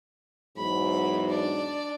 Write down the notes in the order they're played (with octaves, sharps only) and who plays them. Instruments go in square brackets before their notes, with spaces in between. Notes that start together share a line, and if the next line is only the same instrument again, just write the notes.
[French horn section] E2 G#2 F#3 [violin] B5
[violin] D4 D5